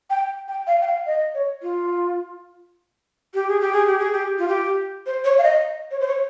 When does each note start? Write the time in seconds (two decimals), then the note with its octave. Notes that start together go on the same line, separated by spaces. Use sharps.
0.10 G5
0.48 G5
0.67 F5
0.82 G5
0.87 F5
1.06 D#5
1.34 C#5
1.62 F4
3.34 G4
3.48 G#4
3.61 G4
3.73 G#4
3.87 G4
3.98 G#4
4.13 G4
4.39 F4
4.48 G4
5.06 C5
5.24 C#5
5.38 F5
5.43 D#5
5.91 C#5
6.00 C5
6.08 C#5